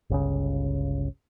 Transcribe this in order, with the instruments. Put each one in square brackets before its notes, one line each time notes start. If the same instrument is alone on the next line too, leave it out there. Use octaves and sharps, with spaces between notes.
[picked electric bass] G1 C#2 C#3